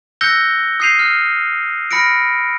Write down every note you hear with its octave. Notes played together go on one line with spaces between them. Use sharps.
E6 F#6 G6 A#6 C#7 G7
D#6 G6 C7 D#7 F7
F6
B5 F6 A#6 C#7 D7